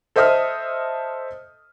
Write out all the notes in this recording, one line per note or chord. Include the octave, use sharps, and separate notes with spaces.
A4 C5 D#5 E5 D#6 F6